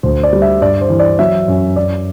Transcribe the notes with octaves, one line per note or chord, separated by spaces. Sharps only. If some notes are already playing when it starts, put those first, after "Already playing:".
D2 C5
D5
G3
E5
G2 D5
C5
E3
D5
F#3 E5
F#2
F#2 D5